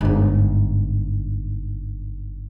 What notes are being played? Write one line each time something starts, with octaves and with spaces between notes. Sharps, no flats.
G1 G#2